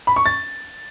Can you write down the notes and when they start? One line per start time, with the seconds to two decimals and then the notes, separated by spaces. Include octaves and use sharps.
0.07 B5
0.16 C#6
0.26 A6